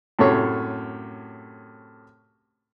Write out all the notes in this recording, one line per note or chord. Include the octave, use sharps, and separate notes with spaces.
F#2 A2 C3 A3 C#5